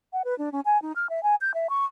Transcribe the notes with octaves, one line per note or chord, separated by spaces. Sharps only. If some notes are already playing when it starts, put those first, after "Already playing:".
F#5
B4
D4
C#4
G#5
D#4
F6
E5
G#5
G6
E5
C#6